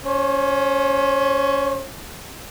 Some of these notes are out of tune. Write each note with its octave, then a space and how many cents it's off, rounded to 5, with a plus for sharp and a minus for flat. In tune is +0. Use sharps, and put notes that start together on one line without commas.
C#4 +15 C5 +45